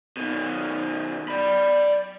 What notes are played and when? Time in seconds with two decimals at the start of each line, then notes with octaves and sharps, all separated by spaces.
0.17 B2 D#3
1.28 D5 B5